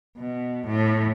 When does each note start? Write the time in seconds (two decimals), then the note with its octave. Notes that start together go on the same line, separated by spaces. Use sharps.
0.18 B2
0.66 A2